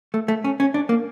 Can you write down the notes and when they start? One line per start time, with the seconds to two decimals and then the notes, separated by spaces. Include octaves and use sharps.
0.14 A3
0.28 A3
0.44 C#4
0.60 C#4
0.74 D4
0.89 A#3